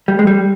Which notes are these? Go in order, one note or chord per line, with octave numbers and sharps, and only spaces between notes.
G3
G#3
G3